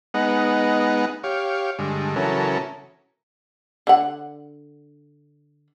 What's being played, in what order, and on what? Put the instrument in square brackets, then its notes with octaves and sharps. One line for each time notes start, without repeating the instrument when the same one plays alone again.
[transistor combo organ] G#3 B3 D#4 F#5
G4 C#5 F5
G2 D3 G#3
C#3 E3 F#3 C#4 A4 A#4
[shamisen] D3 F#5